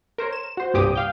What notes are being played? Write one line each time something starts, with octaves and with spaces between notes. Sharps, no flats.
A#4 C5 C#5
E7
F#4 C5
C2 G2 A#2 G4 D6 D#6
F5 G5